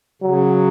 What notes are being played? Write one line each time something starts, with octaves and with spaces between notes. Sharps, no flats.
C#3 F#3